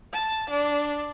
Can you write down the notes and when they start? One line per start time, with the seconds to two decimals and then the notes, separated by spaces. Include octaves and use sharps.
0.13 A5
0.50 D4